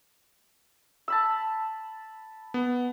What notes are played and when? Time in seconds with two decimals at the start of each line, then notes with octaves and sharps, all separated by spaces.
1.08 A5 B5 E6
2.54 B3